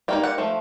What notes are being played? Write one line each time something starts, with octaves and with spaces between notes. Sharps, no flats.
G3 A#3 D#4 G5
F#5
F3 A3